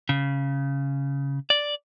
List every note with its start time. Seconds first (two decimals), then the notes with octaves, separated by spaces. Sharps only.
0.09 C#3
1.50 D5